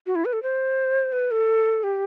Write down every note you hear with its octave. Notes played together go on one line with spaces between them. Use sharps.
F#4
E4
B4
A4
C5
B4
A4
G4